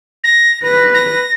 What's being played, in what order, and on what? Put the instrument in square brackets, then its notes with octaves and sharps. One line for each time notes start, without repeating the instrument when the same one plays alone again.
[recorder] A#6
[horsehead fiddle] B4 [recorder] A#6
[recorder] A#6